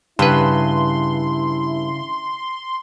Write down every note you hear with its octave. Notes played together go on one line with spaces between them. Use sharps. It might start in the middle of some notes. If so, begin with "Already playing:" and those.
G2 C#3 E4 B4 C6